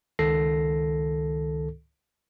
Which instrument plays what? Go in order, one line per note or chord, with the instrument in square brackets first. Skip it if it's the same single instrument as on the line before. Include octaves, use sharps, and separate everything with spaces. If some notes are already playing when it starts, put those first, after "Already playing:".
[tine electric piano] C#2 D#3 A4 A#6 C7